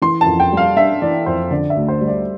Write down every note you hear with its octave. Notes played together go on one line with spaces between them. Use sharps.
E3 C6
A5
F2
G5
G3
F5
D4 E5
E3 D5
F2 C5
D3 D5
E5
D2
C5
G3
D5